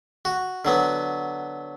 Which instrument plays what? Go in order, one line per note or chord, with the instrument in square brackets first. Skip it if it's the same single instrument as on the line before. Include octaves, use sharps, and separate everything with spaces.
[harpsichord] F#4
D3 F#3 B3